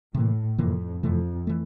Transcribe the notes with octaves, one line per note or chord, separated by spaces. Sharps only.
A2 C3 E3 A#3
F2 C3 E3 A#3
F2 C3 E3 A3
E3 A3